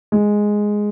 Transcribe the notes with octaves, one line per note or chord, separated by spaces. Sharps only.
G#3